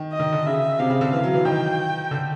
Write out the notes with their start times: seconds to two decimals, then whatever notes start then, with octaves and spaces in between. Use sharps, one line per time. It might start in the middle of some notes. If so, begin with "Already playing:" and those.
Already playing: D#3
0.13 D#5
0.20 D#3
0.32 D3
0.46 C#3 E5
0.79 C3 F5
0.90 C#3
1.01 D3
1.13 E3
1.24 F#3
1.34 E3
1.45 D#3 G5
2.11 D3